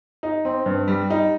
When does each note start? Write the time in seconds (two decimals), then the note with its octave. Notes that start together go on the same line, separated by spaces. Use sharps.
0.23 D#4
0.45 C4
0.66 G2
0.88 G3
1.10 D#4